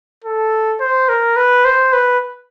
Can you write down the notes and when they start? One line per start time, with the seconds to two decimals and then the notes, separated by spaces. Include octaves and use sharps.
0.24 A4
0.80 C5
1.09 A#4
1.37 B4
1.65 C5
1.93 B4